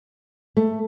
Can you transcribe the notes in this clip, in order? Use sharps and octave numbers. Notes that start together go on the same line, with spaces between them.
A3